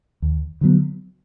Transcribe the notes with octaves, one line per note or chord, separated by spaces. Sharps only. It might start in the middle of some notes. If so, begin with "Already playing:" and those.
D#2
D3 F#3 B3